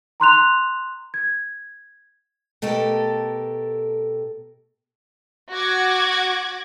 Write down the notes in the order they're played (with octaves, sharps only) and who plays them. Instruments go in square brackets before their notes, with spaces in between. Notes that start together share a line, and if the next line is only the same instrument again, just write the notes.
[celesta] A#5 C6 F#6 F7
G#6
[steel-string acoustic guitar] B2 A3 G4 A4 A#4
[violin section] F#4 D6 F#6 G#6 A#6